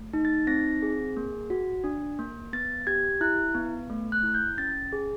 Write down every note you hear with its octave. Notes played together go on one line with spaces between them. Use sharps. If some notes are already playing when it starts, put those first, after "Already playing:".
Already playing: A3
D#4
A6
C4 A#6
G#4
A#3
F#4
D4
A#3
B3 A6
G4 G#6
E4 F#6
B3
A3
F#6
E4
G6
C#4 A6
G#4